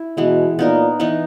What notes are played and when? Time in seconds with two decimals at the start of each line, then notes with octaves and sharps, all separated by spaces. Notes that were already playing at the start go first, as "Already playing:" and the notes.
Already playing: E4
0.17 B2 E3 G#3 B3
0.59 A#2 B3 D#4 A#4
1.00 E3 B3 D#4